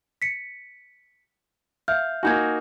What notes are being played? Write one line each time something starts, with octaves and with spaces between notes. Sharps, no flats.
B6 C#7
E5 F5 F6 G6
A#3 D#4 F#4 G#5 G6 G#6